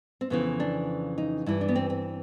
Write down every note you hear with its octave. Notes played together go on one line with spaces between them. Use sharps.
C4
F2 C#3 E3 B3
D4
D#4
G2 E3 E4
D4
B3
C4
C4